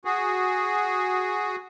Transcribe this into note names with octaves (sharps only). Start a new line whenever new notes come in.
F#4 G#4